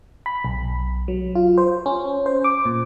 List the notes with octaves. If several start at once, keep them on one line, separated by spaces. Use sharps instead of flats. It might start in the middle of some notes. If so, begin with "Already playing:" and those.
B5
B1
F#3
F4
C5
C#4
C5
D6
A#2